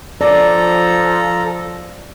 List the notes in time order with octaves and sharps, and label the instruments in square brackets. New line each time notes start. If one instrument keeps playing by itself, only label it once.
[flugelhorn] F3 [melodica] A4 A#5 [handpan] D5